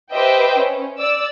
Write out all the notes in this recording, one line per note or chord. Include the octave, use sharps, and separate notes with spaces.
G4 B4 C5 D#5 E5 G5
C#4
D5 E6